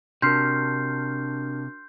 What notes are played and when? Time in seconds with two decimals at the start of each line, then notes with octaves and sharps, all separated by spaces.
0.22 C3 D4 F#4 A#4 C6 F6 G6 C7